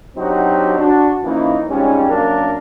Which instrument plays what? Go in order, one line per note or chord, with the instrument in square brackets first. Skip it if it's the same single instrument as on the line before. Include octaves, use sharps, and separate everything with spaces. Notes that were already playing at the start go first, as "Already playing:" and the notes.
[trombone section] F#3 C4 D4 D#4 F#4 G4
D4 F#4
E3 F3 A#3 C#4 D#4 E4
G#2 F3 G3 C4 C#4
F#2 A#3 D4 A#4